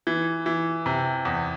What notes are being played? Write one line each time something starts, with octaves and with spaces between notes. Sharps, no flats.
E3
E3
C3
E2